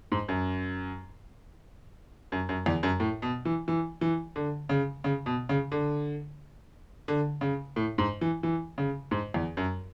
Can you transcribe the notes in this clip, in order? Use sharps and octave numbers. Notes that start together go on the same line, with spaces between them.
G#2
F#2
F#2
F#2
E2
F#2
A2
B2
E3
E3
E3
D3
C#3
C#3
B2
C#3
D3
D3
C#3
A2
G#2
E3
E3
C#3
G#2
E2
F#2